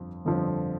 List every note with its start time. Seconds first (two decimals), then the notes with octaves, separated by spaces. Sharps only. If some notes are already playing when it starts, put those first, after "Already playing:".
Already playing: G1 F2 D3 F3
0.25 G1 F2 D3 F3